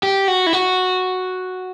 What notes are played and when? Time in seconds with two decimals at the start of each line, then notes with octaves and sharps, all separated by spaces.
0.03 G4
0.28 F#4
0.47 E4
0.53 F#4